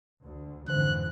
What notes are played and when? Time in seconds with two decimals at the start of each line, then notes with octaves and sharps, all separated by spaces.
0.23 D2
0.68 F2 G#2 D3 E3 C5 F#6